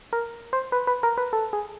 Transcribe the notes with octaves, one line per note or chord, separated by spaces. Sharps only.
A#4
C5
B4
B4
A#4
B4
A4
G#4